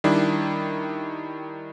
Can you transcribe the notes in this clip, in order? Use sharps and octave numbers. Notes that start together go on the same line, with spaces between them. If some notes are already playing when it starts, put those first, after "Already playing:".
D#3 G3 D4 E4